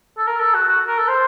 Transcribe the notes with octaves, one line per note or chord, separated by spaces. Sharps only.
A4
A#4
A4
F#4
F#4
A#4
A4
C5